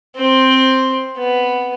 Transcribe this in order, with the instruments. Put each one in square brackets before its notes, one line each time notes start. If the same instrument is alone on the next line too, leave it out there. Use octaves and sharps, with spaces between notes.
[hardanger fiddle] C4 C5
B3